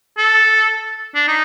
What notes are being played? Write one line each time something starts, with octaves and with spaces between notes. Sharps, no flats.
A4
D4
D#4